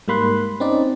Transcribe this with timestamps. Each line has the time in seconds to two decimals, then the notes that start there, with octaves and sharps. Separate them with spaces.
0.08 G#2 G3 A#3 B5 C6 F#6
0.60 C4 C#4 D#4 D5